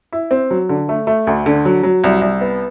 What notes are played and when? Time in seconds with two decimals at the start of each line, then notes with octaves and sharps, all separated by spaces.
0.13 E4
0.31 C4
0.51 F#3
0.69 D3
0.89 A3
1.07 A3
1.27 D2
1.46 D3
1.65 F#3
1.83 F#3
2.04 C2
2.22 C2
2.41 B3